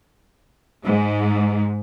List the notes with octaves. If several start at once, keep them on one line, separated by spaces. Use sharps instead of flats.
G#2